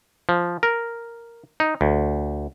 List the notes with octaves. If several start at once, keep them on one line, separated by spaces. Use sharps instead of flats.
F3
A#4
D#4
D2